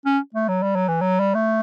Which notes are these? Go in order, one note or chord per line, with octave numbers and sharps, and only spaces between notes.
C#4
A3
F#3
G3
F#3
E3
F#3
G3
A3